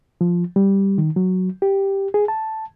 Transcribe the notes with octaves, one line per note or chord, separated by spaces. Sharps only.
F3
G3
D#3
F#3
G4
G#4
A5